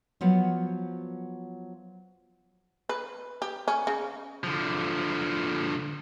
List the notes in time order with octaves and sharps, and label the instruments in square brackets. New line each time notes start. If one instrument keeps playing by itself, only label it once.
[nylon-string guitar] F3 F#3 B3 C#5
[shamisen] B4
G4
C#4
C#3
[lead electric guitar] D3 F3